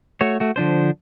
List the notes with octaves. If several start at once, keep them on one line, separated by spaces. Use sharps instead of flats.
A3 F#4 C#5
A3 F#4
D3 F3 D4 C5